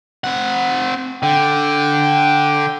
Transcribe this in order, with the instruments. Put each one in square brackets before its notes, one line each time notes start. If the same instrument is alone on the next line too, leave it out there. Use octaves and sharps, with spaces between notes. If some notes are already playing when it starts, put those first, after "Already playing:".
[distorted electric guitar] C4 F#5
[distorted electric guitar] D3 [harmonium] G5